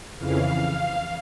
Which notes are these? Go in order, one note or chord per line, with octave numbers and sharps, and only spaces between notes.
F2 C#3 E3 F5